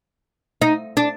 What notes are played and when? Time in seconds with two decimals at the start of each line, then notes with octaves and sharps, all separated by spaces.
0.62 D#4
0.97 D4